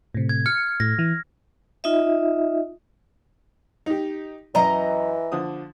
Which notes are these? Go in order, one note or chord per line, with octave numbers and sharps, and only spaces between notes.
A2 C3
G#6
F6 C#7
A2 A#6
E3
D#4 F4 D#5 E5
D#4 G4
F#2 E3 D#5 A#5
D3 F3 D#6